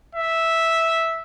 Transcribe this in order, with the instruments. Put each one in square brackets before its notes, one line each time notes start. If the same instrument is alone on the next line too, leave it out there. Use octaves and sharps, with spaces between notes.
[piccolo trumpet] E5